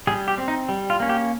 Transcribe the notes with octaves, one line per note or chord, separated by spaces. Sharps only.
G3 G#4
G4
C4
D#4
G3
F4
A#3 C#4
G4